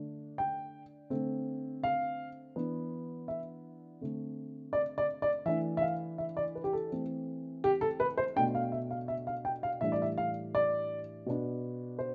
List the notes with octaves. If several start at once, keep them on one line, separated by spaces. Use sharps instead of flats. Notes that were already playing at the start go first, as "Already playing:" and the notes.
Already playing: D3 A3 D4
G5
D3 A3 C4
F5
E3 B3 D4
E5
D3 A3 C4
D5
D5
D5
E3 A3 D4 E5
E5
F5
E5
D5
B4
G4
A4
E3 A3 C4
G4
A4
B4
C5
B2 A3 D4 G5
F5
E5
F5
E5
F5
G5
F5
A2 E3 G3 D4 E5
D5
E5
F5
D5
B2 B3 D4
C5